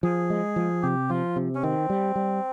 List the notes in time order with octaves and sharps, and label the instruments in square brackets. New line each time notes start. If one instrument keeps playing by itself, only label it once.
[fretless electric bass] F3 [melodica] G#4
[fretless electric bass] G#3
F3
[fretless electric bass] C3 [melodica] G4
[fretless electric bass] F3 [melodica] F4
[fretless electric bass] C3
[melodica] C#4
[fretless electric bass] D#3 [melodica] C4
[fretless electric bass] G3
G3